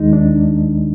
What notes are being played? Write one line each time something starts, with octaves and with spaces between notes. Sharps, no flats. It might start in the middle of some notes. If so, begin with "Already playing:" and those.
Already playing: D#2 D#3 G#3 D#4
D4